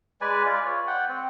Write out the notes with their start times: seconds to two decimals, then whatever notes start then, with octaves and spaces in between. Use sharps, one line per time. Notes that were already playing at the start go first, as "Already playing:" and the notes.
0.21 G#3 B4 D5 G#5
0.45 F4 D5
0.66 C#5
0.87 F#5 G5
1.08 C4